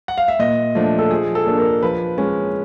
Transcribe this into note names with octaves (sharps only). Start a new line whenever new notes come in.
F#5
F5
E5
A#2 D#5
F3 A3 D4
A4
F3 G#4
A4
A#3 D4
A#4
F3 B4
G#3 C#4